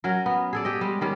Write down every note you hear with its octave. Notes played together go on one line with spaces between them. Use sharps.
F#3 C#4 A#4
B3
G#4 A4 D5
G4 D#5
G3 G#3
D#3 G3 C#4